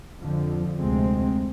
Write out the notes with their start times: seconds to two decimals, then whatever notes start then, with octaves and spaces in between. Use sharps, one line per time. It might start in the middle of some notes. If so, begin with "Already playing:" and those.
0.19 F2 D3 F3
0.79 D2 C3 G#3 C4